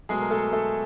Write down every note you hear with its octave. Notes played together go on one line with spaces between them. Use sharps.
B2 F#3 G#3 A3 G#4
A#4
A3 A4
A3 A4